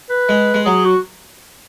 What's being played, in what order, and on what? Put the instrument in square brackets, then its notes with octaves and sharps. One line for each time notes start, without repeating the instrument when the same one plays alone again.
[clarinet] B4
[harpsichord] G#3
G#3
[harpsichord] F#3 [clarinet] G#4
[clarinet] F#4